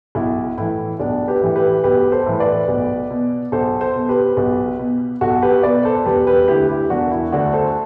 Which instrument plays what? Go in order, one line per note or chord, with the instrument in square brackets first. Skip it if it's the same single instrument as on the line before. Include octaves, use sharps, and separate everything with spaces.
[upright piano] B1 E4
A2 E3 E4
B1 D4
G4 B4
A2 E3
G4 B4
B1 G4 B4
A4 C5
A2 E3
B4 D5
B1
B2
B1 A4 C5
A4 C5
B2
G4 B4
B1
B2
B1 F#4 A4
G4 B4
B2 B4 D5
A4 C5
E1 G4 B4
G4 B4
D2 D3 E4 G4
E4 G4
E1 D4 F#4
E4
D2 D3 D4 F#4
A4 C5